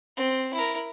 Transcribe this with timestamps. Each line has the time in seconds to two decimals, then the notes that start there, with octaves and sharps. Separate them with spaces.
0.17 C4
0.53 E4 A#4